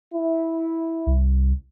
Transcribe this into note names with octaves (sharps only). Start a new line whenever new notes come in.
E4
C2